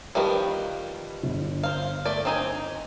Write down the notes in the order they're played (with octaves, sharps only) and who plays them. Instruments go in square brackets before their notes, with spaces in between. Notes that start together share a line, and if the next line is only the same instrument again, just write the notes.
[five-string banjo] D#3 F3 G3 [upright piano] G4 B4 F5
[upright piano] G1
[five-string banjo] C5 F5
A3 D5
C4 D#4 G#5